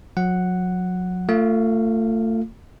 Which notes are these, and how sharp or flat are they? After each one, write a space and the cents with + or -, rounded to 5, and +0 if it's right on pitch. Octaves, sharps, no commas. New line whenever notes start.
F#3 -30 F#5 +0
A3 +30 F4 +0 F5 +0